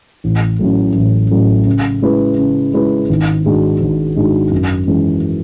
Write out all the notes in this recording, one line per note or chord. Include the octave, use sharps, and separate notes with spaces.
A1
A2 F#3 A3 C#4
A1
A2 F#3 A3 C#4
C#3
G#3 C#4 E4 B4
C#3
G#3 C#4 E4 B4
G#1
G#2 G#3 D4 F#4
G#1
G#2 G#3 D4 F#4
F#2
E3 G#3 C#4